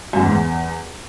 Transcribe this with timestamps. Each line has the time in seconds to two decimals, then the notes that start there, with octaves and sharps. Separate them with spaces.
0.13 F#2
0.19 E2
0.26 G#2
0.32 E2